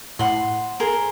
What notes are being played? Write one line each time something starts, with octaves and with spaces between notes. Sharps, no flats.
A2 F#5 C6
G#4 A#4 C5